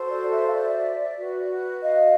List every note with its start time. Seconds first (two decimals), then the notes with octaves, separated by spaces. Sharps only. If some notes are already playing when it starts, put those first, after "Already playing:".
Already playing: F#4 A4 C5
0.09 D5
0.31 D5 E5
0.46 F5
0.52 D5 E5
1.18 F#4 B4
1.82 D#5 F5